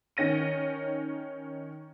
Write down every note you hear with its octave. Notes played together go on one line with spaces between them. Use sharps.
D#3 C#4 A#6 D#7